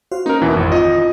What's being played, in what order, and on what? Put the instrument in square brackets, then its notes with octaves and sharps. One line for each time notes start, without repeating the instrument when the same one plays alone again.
[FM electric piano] F#4 C5 F5
[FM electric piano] A#3 C#4 [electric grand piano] D#4 A#4
[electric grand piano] E2 B2 E3
[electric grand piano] G#1 [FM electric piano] F2
[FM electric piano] F4 [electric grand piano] D#5